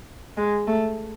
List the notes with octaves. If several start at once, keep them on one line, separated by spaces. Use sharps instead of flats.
G#3
A3